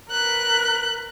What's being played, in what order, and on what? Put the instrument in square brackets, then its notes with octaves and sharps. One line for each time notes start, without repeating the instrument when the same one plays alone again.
[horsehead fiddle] A#4 B4 [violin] F#6